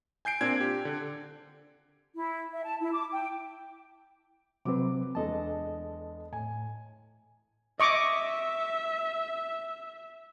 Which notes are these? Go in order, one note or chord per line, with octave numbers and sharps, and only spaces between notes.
G#5 G6 C7 D7
A#2 C4 D4 G#6
G4
D3
E4
E5
A5
E4
D6
G5
C3 F#3 C4 B4 D6
E2 G#3 D4 A4 D#5 A5
A2 G#5
D#5 E5 C#6 D6